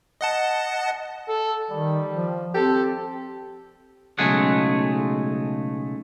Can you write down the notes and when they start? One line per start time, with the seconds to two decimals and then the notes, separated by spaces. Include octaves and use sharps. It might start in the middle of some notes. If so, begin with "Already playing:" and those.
0.21 D#5 F#5 A5
1.28 A4
1.71 D#3 G3
2.11 F3
2.54 C4 G4 A4
4.18 B1 C#3 G#3 A3 G#4 F#5